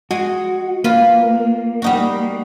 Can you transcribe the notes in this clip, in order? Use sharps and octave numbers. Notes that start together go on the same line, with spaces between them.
G#3 F#4
A#3 F4 B4
G3 D#4 F#4